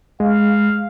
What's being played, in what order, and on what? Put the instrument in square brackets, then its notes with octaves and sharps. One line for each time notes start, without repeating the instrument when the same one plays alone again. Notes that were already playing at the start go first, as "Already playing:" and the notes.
[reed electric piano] G#3 [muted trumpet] F5